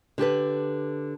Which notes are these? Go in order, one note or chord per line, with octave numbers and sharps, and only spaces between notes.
D3 G4 A4 B4